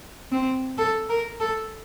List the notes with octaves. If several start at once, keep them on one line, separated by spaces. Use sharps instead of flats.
C4
A4
A#4
A4